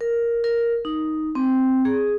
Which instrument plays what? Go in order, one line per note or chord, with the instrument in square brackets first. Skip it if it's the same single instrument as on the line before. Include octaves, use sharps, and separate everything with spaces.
[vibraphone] A#4
A#4
D#4
C4
G#4